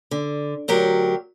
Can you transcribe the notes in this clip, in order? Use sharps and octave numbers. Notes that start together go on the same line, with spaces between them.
D3
D2 F#3 G4 A#4